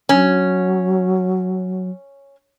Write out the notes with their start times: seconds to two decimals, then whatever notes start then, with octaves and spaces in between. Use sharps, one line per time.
0.09 F#3 C#4